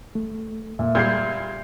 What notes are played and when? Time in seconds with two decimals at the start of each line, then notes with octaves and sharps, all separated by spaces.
0.15 A3
0.79 A#2 E5
0.95 A#2 G3 G#3 G6 G#6 C7